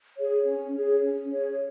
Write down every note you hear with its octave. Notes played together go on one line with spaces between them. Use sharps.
G#4 C#5
C#4
G#4 C#5
C#4
G#4 C#5